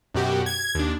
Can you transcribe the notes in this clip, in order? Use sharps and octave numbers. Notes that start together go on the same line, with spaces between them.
F#2 B2 F#4 G4
G#6
D#2 D4